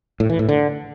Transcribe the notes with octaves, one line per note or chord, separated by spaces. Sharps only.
A2
E3
A2
D3